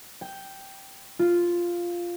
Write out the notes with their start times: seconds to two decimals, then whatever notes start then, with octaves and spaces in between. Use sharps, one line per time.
0.21 G5
1.19 F4